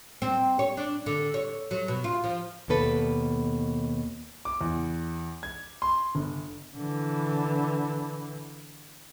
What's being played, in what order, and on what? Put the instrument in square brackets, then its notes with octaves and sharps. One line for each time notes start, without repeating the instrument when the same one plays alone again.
[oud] C4
C#5
D4
D3
C#5
F#3
B2
F4
F3
[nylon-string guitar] D#2 B2 A#3 A4 B4
[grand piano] D6
E2
G#6
C6
G1
[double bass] D3 E3